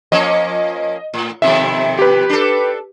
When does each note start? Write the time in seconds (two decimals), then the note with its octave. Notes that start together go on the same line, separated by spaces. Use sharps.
0.12 F3 A#3 C#4 D#5
1.14 A2
1.42 F2 B2 D#3 E5
1.99 G4 B4
2.29 D4 A4